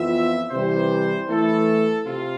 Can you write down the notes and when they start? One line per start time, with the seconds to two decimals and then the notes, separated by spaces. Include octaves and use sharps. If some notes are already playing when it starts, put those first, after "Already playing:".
Already playing: F2 E3 B3 F4 E5
0.51 C3 E3 G3 C5
1.29 E3 A3 E4 A4
2.07 C3 F4